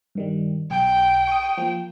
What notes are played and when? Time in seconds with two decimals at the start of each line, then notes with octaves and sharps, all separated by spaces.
0.15 G2 D#3 G3
0.71 B1 G5
1.27 C#6 D#6
1.58 F3 A#3